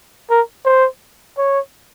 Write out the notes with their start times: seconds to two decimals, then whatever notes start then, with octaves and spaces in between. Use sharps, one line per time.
0.30 A#4
0.65 C5
1.38 C#5